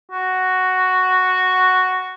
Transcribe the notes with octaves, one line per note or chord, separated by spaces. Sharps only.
F#4